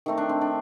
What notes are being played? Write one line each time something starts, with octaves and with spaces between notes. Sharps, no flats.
D#3 A3 C4 D#4
D4
C4
D4